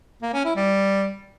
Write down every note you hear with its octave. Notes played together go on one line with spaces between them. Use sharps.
A#3
C#4
E4
G3